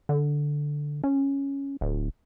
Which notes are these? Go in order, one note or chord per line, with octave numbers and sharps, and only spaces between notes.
D3
C#4
D1